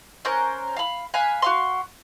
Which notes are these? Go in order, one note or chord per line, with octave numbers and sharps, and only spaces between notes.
C#4 A#4 C5 F#6
F5 B5
F5 G#5 B5 F#6
F#4 F5 C6